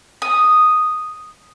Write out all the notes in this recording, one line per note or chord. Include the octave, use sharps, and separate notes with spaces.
D#6